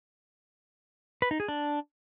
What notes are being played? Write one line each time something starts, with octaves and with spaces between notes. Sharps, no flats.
B4
D#4
G#4
D4